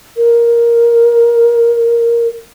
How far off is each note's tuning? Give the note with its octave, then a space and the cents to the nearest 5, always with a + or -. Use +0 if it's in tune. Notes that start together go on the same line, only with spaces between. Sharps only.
A#4 +5